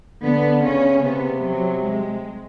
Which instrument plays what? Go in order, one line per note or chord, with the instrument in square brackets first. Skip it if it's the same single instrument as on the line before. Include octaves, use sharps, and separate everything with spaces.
[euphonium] D3 [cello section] B3
[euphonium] C#3 [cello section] C#4
[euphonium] C3 [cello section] B3
[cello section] F#3
G#3